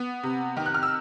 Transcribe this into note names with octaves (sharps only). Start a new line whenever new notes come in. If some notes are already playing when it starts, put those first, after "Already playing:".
Already playing: B3
C3
D#3
F#6
F6
E6